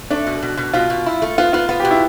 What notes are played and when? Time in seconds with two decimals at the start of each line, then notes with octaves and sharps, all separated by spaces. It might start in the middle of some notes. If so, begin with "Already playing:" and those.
0.10 A3 D4
0.27 B2
0.43 B2
0.57 B2
0.73 B2 F4
0.90 B2
1.06 E4
1.22 A3
1.38 B3 F4
1.53 B3 F4
1.69 B3 F4
1.80 G4
1.85 B2
1.91 E4